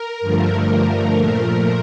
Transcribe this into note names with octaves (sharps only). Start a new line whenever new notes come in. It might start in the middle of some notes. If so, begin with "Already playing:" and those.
Already playing: A#4
G2 D3 F3 A3
A#2 F3 A3